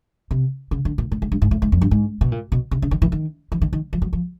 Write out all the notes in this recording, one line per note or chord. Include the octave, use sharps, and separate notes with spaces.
C3
C#3
D3
A#2
A2
G#2
G2
G#2
A2
G#2
F2
G2
G#2
B2
A#2
B2
C3
C#3
D#3
E3
D#3
E3
D#3
D#3
F3
F#3
F3